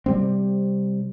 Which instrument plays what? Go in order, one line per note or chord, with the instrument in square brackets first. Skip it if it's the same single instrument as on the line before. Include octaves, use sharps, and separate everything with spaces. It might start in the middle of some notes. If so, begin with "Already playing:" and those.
[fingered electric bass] C3 G3 C4